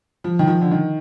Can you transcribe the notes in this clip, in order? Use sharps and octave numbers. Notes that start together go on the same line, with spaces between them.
F3
D#3
F3
D3
D#3